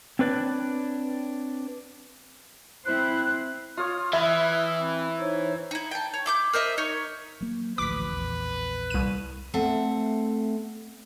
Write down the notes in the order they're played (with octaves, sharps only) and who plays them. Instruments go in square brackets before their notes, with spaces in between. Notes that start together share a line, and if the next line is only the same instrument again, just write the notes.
[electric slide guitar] C4 D4 B4 C#5 D5
[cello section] C4 E4 C5 [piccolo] F#6
[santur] F4 C#5 [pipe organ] D#6 F6
[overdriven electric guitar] E3 [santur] E4 B5 [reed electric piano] E5
[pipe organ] C4
D#4 C5 C#5
[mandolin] D#4 E4
G5 A5
C#5
E4 D6 G6
A#4 C5 D#5 E5
D#4 C#5
[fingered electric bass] F#3 A#3
[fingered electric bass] A1 D2 F3 [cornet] B4 [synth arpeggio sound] D6 B6
[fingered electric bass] A#1 E2
[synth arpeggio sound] C2 D#7
[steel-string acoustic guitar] A3 C4 E5 F#5